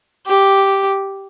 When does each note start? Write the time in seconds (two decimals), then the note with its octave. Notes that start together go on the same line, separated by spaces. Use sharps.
0.27 G4